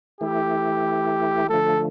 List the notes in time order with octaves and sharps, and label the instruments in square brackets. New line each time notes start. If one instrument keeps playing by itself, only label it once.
[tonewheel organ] E3 A3 E4 [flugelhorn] G4
[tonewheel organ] D3 F3 A3 [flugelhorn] A4